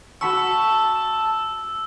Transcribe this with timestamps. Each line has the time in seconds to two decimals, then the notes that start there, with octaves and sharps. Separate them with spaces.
0.21 F#4 A5 B5 C#6 E6